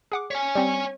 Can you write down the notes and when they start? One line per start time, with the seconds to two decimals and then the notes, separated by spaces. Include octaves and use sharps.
0.12 G#4 F#5 D6
0.31 C#5 G#5 B6
0.55 G3 C4